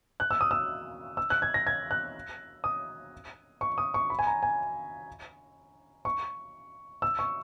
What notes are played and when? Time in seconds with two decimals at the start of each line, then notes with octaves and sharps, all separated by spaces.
0.20 F#6
0.31 E6
0.41 D#6
0.51 E6
1.17 E6
1.30 F#6
1.42 G#6
1.54 A#6
1.67 G#6
1.91 F#6
2.64 D#6
3.61 C#6
3.78 D#6
3.94 C#6
4.10 B5
4.19 G#5
4.27 A#5
4.43 G#5
6.05 C#6
7.02 E6
7.19 C#6